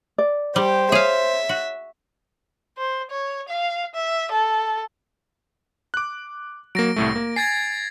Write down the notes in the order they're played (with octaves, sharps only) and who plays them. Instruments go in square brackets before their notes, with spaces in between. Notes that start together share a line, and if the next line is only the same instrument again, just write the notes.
[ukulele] D5
[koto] G3 [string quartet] G4 [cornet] C5
[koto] G#4 F5 [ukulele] C#5 [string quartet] E5
[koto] F#4
[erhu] C5
C#5
F5
E5
A4
[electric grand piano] D6 F#6
[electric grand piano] F#3 A#3 [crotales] A#6 D7
[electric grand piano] C2 A2 A3
A#3
[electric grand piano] G#5 [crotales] G#6 A6 C7